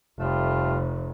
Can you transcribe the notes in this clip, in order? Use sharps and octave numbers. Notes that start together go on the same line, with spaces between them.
F1 G3 A3 F4